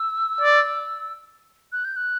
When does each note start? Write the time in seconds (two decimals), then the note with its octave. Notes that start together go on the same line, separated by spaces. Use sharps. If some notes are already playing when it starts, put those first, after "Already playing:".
Already playing: E6
0.41 D5
1.72 F#6
1.85 G6
1.96 F#6